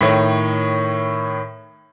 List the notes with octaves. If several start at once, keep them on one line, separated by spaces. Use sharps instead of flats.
A2 D#3 C#5